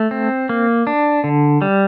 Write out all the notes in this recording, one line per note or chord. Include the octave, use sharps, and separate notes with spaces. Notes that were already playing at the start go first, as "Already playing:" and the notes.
Already playing: A3
C4
A#3
D4
D3
G3